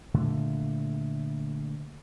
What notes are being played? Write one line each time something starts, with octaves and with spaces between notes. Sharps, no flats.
A#2 D3 A3